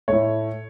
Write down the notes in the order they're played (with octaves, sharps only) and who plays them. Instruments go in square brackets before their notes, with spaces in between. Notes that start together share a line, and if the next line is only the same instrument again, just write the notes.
[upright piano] A2 A3 C#5